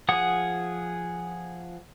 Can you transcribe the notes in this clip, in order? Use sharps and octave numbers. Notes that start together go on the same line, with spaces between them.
F3 G#4 F#5 D#6